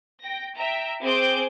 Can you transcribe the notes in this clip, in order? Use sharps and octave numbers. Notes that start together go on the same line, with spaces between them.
G5 A#6
E5 G5 A#5
C4 G#4 C5 D6 G6 D7